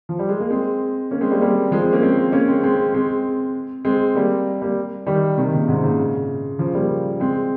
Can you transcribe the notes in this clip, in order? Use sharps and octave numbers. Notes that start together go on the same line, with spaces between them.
F3
G3
G#3
A#3
G#3 C4
A#3 C#4
G#3 C4
G3 A#3
G3 A#3
F3 G#3
G#3 C4
A#3 C#4
G#3 C4
A#3 C#4
G#3 C4
G#3 C4
G#3 C4
G#3 C4
G3 A#3
G3 A#3
D#3 G3
C3 D#3
A#2 C#3
G#2 C3
A#2 C#3
C#3 F3
G3 A#3
G#3 C4